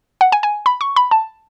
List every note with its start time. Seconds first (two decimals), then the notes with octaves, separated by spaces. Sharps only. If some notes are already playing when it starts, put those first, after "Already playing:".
0.21 F#5
0.32 G#5
0.43 G#5
0.66 B5
0.81 C#6
0.96 B5
1.11 A5